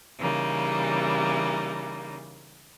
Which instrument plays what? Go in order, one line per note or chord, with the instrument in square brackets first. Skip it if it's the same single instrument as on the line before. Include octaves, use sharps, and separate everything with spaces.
[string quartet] C#3 E3 G3 A#3 D#4